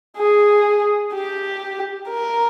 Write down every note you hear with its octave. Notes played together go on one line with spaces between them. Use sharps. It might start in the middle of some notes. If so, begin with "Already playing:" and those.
G#4
G4
A#4